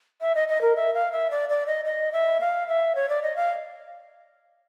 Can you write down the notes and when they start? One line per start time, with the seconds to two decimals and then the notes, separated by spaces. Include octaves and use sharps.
0.21 E5
0.35 D#5
0.48 D#5
0.61 A#4
0.76 E5
0.94 F5
1.12 E5
1.31 D5
1.49 D5
1.66 D#5
1.85 D#5
2.12 E5
2.41 F5
2.67 E5
2.95 C#5
3.09 D5
3.22 D#5
3.36 F5